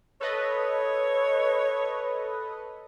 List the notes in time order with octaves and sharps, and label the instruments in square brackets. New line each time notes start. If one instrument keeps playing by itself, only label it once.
[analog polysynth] A4 B4 D#5 [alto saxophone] C#5